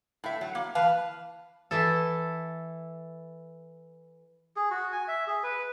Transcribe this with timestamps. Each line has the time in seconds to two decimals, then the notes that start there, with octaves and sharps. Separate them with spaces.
0.24 A2 E5
0.41 F#3
0.55 A#3
0.75 E3 B4 F5 A5
1.71 E3 E4 A4
4.56 G#4
4.71 F#4
4.92 G#5
5.08 E5
5.27 G#4
5.43 B4